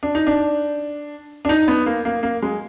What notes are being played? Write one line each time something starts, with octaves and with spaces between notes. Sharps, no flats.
D4
D#4
D4
D4
D#4
B3
A#3
A#3
A#3
G#3